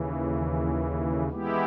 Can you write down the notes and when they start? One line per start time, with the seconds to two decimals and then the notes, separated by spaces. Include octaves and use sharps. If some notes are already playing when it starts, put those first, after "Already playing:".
Already playing: D#2 C#3 E3
1.30 E3 G#3 B3 E4 G4